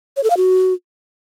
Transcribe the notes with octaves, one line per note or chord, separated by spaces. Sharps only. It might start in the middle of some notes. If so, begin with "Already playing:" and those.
C#5
A4
F5
F#4